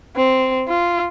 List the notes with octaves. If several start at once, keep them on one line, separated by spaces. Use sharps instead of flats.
C4
F4